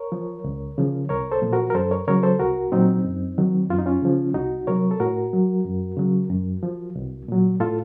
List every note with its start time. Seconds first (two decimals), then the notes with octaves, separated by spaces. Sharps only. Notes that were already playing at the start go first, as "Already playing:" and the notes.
Already playing: A#4 C#5
0.12 F3
0.44 C#2
0.78 C#3 F3
1.09 C2 A#4 C#5
1.32 A4 C5
1.42 A#2 F3
1.53 F#4 A#4
1.70 A#4
1.75 F#2 A4 C5
1.91 A#4 C#5
2.07 C#3 F#3 A#4 C#5
2.23 A4 C5
2.39 C2 F#4 A#4
2.72 A#2 F#3 C4 D#4
3.05 F#2
3.38 D#3 F#3
3.69 F#2 F4
3.79 D#4
3.86 C#4 F4
4.02 C#3 F3
4.34 C2 D#4 F#4
4.67 C3 F#3 A#4 C#5
4.91 A4
5.00 A2 F#4 A#4
5.33 F#3
5.65 F#2
5.97 C#3 F#3
6.30 F#2
6.63 F3
6.95 C2
7.28 A#2 F#3
7.60 A2 F4 A4